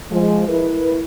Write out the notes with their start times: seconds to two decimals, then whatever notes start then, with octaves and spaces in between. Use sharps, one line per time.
0.11 F3 G#3
0.48 E4 A#4 B4